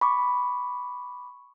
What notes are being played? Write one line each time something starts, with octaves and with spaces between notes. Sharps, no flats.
B5 C#6 D6